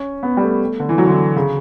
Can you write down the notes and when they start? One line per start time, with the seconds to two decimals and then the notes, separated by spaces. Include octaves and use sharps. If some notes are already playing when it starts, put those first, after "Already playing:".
Already playing: C#4
0.23 B3
0.37 G3
0.43 A3
0.80 D3
0.89 E3
0.98 F#3
1.07 D3
1.11 E3
1.36 C#3